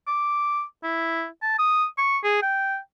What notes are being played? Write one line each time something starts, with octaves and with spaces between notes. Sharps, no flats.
D6
E4
A5
D#6
C#6
G#4
G5